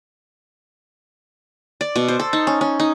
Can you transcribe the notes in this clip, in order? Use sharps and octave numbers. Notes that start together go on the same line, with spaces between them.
D5
B2
C5
A4
D#4
C#4
C#4
D#4